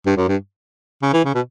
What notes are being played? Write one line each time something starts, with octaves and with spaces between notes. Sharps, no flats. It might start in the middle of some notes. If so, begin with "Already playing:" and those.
G2
F#2
G2
C#3
E3
C#3
B2